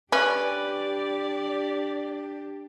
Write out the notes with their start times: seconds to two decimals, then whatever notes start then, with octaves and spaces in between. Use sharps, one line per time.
0.12 C#4 D4 G4 B4 D5